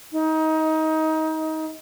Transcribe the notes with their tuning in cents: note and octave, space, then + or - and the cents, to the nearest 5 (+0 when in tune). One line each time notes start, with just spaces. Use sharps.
D#4 +25